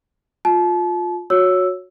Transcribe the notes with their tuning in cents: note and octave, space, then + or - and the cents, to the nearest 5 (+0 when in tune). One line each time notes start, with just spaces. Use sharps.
F4 +20 A5 -35
F#4 -20 C#5 +0 E6 +0